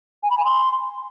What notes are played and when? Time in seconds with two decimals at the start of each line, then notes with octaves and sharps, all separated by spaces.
0.23 G#5
0.30 B5
0.37 G#5
0.45 C6